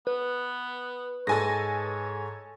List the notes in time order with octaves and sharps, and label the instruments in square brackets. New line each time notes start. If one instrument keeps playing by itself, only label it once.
[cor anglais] B3 [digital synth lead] B4
[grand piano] G#2 G#3 [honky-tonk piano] A4 G#5 A#6 [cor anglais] C#5